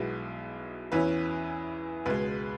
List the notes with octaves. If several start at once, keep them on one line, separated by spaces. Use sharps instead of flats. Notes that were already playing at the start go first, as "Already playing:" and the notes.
Already playing: B1 B2 G#3 B3 E4 G#4
E2 E3 C#4 E4 B4
C#2 B2 G#3 B4